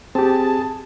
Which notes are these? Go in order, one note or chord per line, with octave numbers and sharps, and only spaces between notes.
C4 G4 G#4 A5